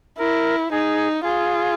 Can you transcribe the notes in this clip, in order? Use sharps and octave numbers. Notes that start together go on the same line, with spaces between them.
E4 A#4
D#4 G#4
F4 G#4